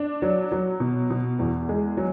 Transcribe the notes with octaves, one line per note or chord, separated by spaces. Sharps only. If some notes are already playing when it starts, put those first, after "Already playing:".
Already playing: D4
F#3
F#3
B2
B2
E2
G#3
F#3